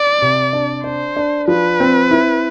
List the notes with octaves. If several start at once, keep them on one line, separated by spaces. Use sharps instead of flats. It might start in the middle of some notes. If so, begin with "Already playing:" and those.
Already playing: D5
C3
D4
D4 C5
D4
F3 B4
C4
E4